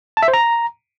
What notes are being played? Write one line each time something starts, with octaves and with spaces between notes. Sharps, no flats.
A5
E5
C5
A#5